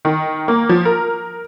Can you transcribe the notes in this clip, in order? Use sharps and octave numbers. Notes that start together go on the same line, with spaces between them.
D#3
A#3
F3
A#4